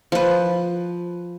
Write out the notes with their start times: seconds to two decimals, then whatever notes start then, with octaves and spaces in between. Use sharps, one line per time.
0.12 F3 B4